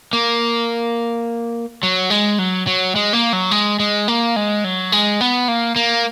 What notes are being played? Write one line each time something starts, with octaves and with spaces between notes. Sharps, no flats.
A#3
F#3
G#3
F#3
F#3
G#3
A#3
F#3
G#3
G#3
A#3
G#3
F#3
G#3
B3
A#3
A#3